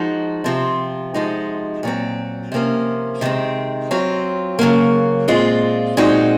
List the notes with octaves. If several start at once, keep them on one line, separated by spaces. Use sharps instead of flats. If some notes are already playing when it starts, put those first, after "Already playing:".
Already playing: F3 G#3 D#4 F#4
C3 F3 C4 F4
C3 F3 G#3 D#4 F#4
A#2 F#3 C4
C3 F3 A#3 C#4
C3 D#3 G#3 C4
F#3 C4 F4
C#3 F#3 A#3
A#2 G#3 C4 F4
A#2 G#3 C4 D#4 F#4